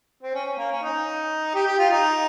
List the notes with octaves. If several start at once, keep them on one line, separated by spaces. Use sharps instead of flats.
C4
C#4
C#4
A#3
C#4
D#4
G4
G4
F4
D#4